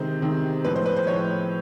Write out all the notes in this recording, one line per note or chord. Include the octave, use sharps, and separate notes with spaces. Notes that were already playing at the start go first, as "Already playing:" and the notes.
Already playing: C3 D#3 G#3 C5
C3 D#3 G#3
A2 F3 G#3 B4
C5
B4
C5
A2 F3 G#3 C#5